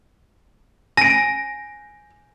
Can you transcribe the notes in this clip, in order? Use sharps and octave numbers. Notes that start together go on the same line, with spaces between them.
G#5 A#6 D7